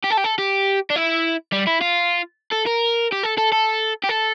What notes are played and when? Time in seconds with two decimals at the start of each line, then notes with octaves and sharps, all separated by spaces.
0.04 G4
0.10 A4
0.17 G4
0.24 A4
0.38 G4
0.90 D4
0.96 E4
1.52 G3
1.67 E4
1.81 F4
2.52 A4
2.67 A#4
3.12 G4
3.23 A4
3.38 A4
3.52 A4
4.04 G4
4.09 A4